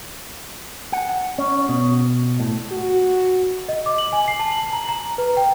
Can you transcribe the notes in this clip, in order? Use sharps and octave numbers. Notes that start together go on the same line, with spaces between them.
F#5
C#4
B2
A2
F#4
D#5
D6
F#7
G#5
C7
A5
F#7
A#5
A#5
B4
G5